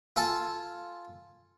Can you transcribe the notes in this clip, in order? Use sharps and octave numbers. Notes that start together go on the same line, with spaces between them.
F4 A4 G#5 A5